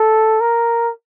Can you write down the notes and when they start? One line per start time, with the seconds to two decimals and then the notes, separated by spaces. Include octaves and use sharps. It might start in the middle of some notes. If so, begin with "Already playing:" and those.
Already playing: A4
0.40 A#4